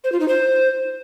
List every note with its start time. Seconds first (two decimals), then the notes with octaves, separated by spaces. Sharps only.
0.04 C5
0.12 F4
0.20 D#4
0.28 C5